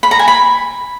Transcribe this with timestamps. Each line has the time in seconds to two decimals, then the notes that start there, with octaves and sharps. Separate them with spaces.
0.03 B5
0.11 A#5
0.19 G#5
0.28 B5